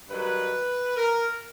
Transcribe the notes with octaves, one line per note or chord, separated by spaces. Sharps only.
G2 D#3 F#3 B4
A#4